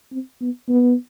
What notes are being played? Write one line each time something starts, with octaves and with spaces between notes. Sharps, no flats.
C4
B3
B3